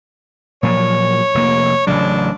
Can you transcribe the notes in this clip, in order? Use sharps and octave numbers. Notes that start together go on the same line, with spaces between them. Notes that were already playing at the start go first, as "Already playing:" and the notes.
A#2 F3 F#3 C#5
F1 A#3
A1 C#3 F#3 D4